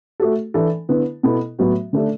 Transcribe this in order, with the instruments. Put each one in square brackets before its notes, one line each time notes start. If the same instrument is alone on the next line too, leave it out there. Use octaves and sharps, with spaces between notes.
[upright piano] A3 F#4 A4
E3 D4 A4
D3 B3 E4 B4
B2 B3 E4 A4
A2 F#3 B3 F#4
D3 A3 D4 A4